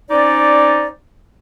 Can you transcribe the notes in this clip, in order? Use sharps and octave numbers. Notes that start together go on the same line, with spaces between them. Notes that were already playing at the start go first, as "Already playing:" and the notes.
C4 C#4 D#4 D5